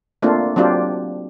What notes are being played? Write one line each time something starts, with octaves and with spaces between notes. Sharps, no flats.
A3 A#3 C4 D4 F4
F#3 C4 D4 F4 G4